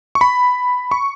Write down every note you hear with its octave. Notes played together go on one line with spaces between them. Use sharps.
C#6
B5
C#6